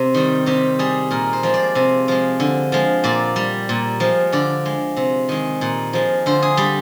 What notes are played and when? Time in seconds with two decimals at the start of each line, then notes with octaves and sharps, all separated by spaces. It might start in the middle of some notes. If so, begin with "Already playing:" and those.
Already playing: C3
0.14 D#3 G3
0.46 C3 G4
0.79 G3 G#4
1.11 A#2 A#4
1.33 C5
1.43 F3 G#3
1.54 D5
1.75 C3
2.08 F3 G#3
2.40 D3
2.72 F3 G#3
3.04 A#2 D5
3.36 G3
3.69 A#2
4.00 F3 G#3
4.33 D3 D5
4.66 G#3
4.97 C3
5.29 D#3 G#3
5.61 A#2
5.93 F3 G#3
6.26 D3 C5
6.42 G#4
6.57 G3 G4